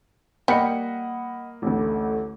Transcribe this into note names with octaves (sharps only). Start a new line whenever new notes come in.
G3 A#3 D#5 F#5 B5 C#7
A1 D2 A3